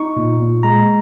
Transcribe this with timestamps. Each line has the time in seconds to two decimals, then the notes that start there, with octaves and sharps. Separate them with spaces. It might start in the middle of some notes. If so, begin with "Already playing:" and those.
Already playing: D#4 C#6
0.17 A#2
0.40 A#2
0.63 G#3 A#5